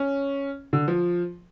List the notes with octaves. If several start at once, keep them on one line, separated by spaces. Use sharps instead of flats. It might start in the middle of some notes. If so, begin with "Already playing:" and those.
Already playing: C#4
D3
F3